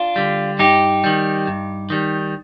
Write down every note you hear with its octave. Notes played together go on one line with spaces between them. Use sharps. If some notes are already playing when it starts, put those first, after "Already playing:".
Already playing: D4 F4
D3 G3
G2 D#4 G4
D#3 G3
G2
D#3 G3